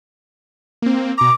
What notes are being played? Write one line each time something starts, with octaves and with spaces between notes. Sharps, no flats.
A#3 C4
B2 A#5 D6